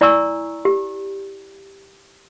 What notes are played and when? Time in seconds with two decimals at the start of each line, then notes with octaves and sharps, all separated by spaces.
0.01 E4 D5 G#5 A#5 C#6 E6
0.65 G4